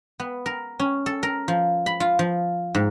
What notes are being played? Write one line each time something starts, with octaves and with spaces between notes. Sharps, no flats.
B3
A#4
C#4
A4
A#4
F3
B5
F4
F3
G#2